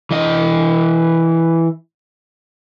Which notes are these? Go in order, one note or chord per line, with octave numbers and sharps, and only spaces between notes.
E3 D#5